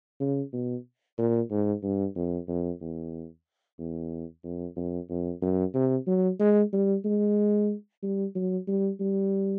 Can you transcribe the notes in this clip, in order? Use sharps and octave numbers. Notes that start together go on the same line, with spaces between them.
C#3
B2
A#2
G#2
G2
F2
F2
E2
E2
F2
F2
F2
F#2
C3
F#3
G#3
G3
G#3
G3
F#3
G3
G3